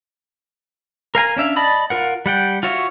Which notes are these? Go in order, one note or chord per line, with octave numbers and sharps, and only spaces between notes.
A#4 F5 G#5 A#5
C#4 D4 E5 F5
D5 D#5 A5 B5 D#6
F4 A#4 F#5
G3 F#5 G5
F4 F#4 C#5 E5